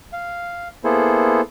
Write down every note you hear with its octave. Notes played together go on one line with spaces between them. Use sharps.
F5
A#3 B3 E4 G#4 A4 C5